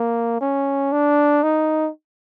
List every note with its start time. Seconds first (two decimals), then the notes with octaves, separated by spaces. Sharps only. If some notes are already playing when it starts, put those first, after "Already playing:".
Already playing: A#3
0.41 C#4
0.92 D4
1.43 D#4